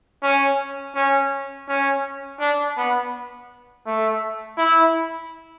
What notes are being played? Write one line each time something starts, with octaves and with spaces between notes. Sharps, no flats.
C#4
C#4
C#4
D4
B3
A3
E4